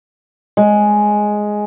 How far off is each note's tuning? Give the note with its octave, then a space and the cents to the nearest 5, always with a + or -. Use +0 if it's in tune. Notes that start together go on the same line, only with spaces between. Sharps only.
G#3 +5